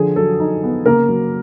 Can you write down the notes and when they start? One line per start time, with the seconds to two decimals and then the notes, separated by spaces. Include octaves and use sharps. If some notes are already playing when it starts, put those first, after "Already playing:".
Already playing: D3 F3 G#4
0.16 F#3 A4
0.40 D#4
0.63 B3
0.86 C#3 A#3 A#4
1.09 F#3